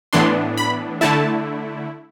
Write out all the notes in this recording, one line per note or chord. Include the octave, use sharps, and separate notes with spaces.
A2 E3 B3 D4 C6
B5
D3 A3 E4 A5